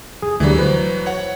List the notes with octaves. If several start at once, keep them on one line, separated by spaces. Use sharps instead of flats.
G#4
D2 D3 E3 F#3 G3
B4 C5
C#5 F#5